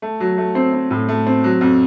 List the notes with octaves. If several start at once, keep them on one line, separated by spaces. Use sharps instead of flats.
A3
F#3
A3
C4
C4
A2
A3
C4
F#3
F2